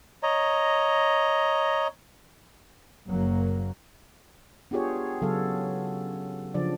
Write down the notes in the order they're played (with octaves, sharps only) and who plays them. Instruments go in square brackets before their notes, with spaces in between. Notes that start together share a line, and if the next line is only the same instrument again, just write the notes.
[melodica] C#5 D#5 A#5
[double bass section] F#1 F#3 A#3
[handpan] B3 D4 F4 G4 G#4 C#5
C#3 F#3 B3 A4 F5
C#3 F3 D4 D5